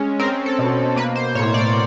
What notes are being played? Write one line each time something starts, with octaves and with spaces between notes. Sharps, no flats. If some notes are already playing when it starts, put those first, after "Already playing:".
Already playing: G#3 C#4
C4 A#4
A4
B2
A#3 B4
C5
A2 C#5
D5